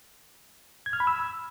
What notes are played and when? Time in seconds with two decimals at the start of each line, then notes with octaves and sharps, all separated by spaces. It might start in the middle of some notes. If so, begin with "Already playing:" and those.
0.86 G#6
0.93 F6
1.00 B5
1.07 E6